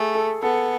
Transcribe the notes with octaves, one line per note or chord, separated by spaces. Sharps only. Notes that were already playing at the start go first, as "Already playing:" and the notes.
Already playing: A3 G#4
A4
B3 A4